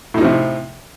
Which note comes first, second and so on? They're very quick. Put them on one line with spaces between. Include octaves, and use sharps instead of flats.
A2 D#4 F3 C3